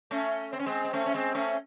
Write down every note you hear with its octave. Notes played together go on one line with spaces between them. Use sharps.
A3 C#4
C4
C#4
G#3 C4
C4
A3 C#4
C#4
G#3 C4
A3 C#4